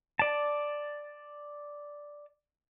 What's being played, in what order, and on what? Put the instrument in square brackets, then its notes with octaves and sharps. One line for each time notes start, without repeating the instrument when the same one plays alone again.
[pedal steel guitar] D5 A5